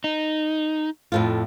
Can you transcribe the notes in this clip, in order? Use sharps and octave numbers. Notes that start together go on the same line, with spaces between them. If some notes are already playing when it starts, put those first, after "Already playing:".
D#4
F2 A2 F4